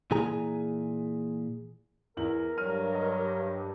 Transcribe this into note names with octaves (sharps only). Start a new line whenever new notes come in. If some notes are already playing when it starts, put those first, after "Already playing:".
A#2 E3 G#4 G#5 A#5
E2 E4 A#4 F#7
G2 F#3 F6 D#7
D#5